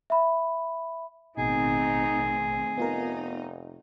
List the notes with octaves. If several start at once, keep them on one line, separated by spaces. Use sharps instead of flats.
E5 B5
A1 B2 D#3 A3 C4 D#4 G#4
F1 B3 D#4 F4 A#4